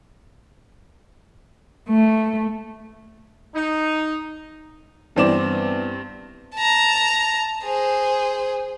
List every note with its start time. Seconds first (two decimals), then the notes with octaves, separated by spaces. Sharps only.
1.88 A3
3.55 D#4
5.16 G2 E3 B3 C4 D5 E7
6.56 A5 A#5
7.64 G#4 C5